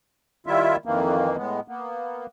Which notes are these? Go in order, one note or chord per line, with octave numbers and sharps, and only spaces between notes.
D#3 G3 E4 F4 E5
F2 D#3 E3 A#3
A2 G#3 B3
A#3 B3